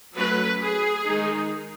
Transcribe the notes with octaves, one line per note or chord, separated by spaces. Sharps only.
F#3 A3 C#4 B4
G#4
D#3 G#3 D#4